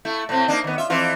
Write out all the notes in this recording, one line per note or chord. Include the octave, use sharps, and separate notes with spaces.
A3 E4
A2 C4
A#3 D4 D#4
D#3 B3
F4 E5
F2 E3 F4